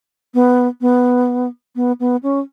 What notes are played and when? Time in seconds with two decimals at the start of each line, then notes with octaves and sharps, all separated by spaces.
0.34 B3
0.81 B3
1.76 B3
2.00 B3
2.23 C#4